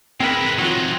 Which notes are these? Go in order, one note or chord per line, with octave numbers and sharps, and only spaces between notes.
G#3 C4 E4 A#4 B4
E3 F#3 C4 D#4 F4